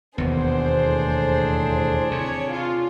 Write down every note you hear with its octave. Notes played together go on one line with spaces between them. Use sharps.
E1 D#2 B3 D4 G#4 C5
A2
C3 C#5
F4